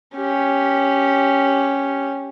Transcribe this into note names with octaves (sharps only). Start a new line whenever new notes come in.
C#4 G4